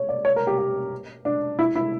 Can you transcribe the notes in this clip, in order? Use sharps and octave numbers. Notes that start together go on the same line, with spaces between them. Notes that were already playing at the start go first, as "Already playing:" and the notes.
Already playing: C#5
D5
C#5
A#4
G4
G4
D4
E4
E4